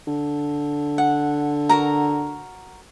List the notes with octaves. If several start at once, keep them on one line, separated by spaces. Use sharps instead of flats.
D3
F#5
F#4 A#4 A#5